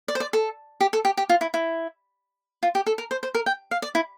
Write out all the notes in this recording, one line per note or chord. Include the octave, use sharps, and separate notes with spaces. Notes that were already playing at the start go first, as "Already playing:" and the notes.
D5
C5
D5
A4
G4
A4
G4
G4
F4
E4
E4
F4
G4
A4
A#4
C5
C5
A#4
G5
F5
D5
E4